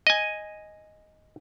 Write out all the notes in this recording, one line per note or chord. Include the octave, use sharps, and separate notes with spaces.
D#5 G#5